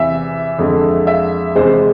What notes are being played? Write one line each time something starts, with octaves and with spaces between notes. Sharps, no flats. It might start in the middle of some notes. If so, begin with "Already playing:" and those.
Already playing: E2 C3 E3 E5
F2 D3 G#3
E5
E2 C3 G#3 C5